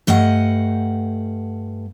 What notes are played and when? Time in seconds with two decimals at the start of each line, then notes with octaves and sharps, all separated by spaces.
0.07 G2 A3 D#5 F5 F#5